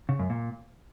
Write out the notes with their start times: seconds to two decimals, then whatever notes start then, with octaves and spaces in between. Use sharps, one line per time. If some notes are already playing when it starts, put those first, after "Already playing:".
0.09 C#3
0.19 F#2
0.30 A#2